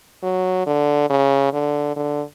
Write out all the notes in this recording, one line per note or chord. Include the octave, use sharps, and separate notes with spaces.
F#3
D3
C#3
D3
D3